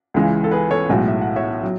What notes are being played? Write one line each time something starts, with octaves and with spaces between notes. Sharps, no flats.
C#2 C#3 E3 G#3
A4
G#4 B4
A4 C#5
B1 A2 G#3 F#4
E5
F#5
C#5 E5
F#3